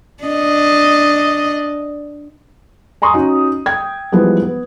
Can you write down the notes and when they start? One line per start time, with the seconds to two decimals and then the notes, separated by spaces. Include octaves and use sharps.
0.23 D4 D#5
3.02 G#5 A#5 C6 C#6 D#6
3.14 C#4 D#4 F#4
3.66 G5 G#6
4.12 E3 F3 G3 G#3 B3 D#4
4.42 B3